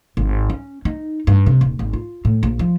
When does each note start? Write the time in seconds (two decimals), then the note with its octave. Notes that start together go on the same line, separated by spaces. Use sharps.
0.17 G#1
0.50 C#4
0.85 D#4
1.27 G2
1.46 C3
1.61 D#1
1.79 G#1
1.93 F4
2.25 A2
2.43 A#1
2.59 F3